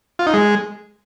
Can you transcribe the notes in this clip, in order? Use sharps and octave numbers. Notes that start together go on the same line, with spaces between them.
F4
D#4
G#3